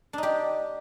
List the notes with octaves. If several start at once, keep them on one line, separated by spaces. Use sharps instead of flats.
D4 D#4 G4